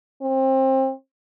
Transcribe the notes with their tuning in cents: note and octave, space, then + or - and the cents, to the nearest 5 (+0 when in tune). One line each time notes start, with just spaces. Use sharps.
C4 +25